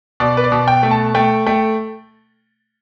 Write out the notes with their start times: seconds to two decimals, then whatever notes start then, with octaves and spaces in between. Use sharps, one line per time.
0.20 B2 D5
0.37 B4
0.44 D5
0.52 B2
0.68 G5
0.83 A3
0.91 A5
1.15 A3 G5
1.46 A3 G5